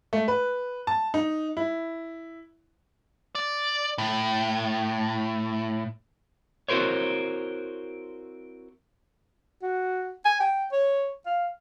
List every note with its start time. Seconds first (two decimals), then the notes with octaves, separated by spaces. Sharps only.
0.13 A3
0.28 B4
0.87 A5
1.14 D#4
1.57 E4
3.35 D5
3.98 A2
6.68 C4 E4 F#4 A#4 C5 C#5
9.62 F#4
10.25 G#5
10.40 G5
10.72 C#5
11.26 F5